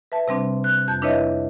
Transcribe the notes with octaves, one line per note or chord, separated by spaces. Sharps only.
B4 E5 A5
C3 G3 C4 D4
F#6
F2 A5 G6
D4 E4 B4 C#5 D#5 E5